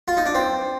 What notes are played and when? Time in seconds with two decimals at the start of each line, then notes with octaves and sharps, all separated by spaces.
0.08 F4
0.17 D#4
0.26 D4
0.35 C4